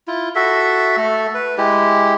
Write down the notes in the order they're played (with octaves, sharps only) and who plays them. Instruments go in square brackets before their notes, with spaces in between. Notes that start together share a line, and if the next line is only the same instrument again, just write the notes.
[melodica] E4 F4
F#4 A4 E5
A3 A4
B4
G#3 E4 G4